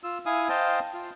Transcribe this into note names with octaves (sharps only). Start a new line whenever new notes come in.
F4 E6
E4 F5 G#5 D#6
C5 D#5 F5 G5 A5
F4